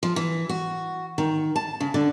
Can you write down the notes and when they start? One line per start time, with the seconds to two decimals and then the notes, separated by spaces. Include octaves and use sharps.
0.03 F3
0.16 E3
0.49 F#4
1.18 D#3
1.56 A5
1.80 C#3
1.94 D3